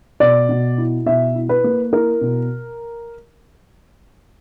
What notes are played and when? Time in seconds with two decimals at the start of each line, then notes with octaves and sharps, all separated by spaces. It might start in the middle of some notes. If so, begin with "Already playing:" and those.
0.20 B2 D5
0.49 B2
0.78 E4
1.06 B2 E5
1.35 E4
1.49 B4
1.64 A#3
1.92 E4 A#4
2.21 B2